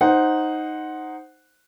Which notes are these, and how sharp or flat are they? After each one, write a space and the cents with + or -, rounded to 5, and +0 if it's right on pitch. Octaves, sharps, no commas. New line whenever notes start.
D#4 +0 C5 +5 F#5 +0